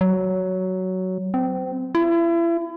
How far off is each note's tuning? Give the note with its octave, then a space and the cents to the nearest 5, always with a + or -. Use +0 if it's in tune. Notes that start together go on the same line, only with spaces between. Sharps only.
F#3 +10
C4 -25
E4 +35